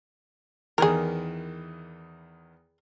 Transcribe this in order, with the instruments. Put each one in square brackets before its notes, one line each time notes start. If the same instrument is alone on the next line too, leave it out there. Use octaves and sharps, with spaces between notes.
[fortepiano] E2 D#3 E3 [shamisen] G#4 A#4